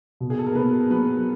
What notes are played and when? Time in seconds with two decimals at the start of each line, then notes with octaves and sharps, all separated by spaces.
0.21 B2
0.30 G#4
0.39 A4
0.47 A#4
0.55 B2 B3 B4
0.90 F#3 B3 B4